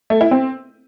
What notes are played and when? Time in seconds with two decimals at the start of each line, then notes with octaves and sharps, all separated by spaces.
0.10 A3
0.21 E4
0.31 C4